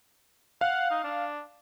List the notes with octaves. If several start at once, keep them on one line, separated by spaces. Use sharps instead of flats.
F5 F#5
D#4
D4